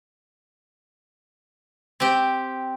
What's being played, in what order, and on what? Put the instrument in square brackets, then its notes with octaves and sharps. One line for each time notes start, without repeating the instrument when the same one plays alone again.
[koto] C4 G4